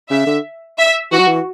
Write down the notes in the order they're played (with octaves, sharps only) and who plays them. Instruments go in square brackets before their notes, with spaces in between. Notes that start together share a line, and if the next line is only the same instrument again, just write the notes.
[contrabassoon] C#3 [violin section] E5
[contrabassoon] D3
[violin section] E5
[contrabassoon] E3 [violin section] F#4
[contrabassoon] F#3
E3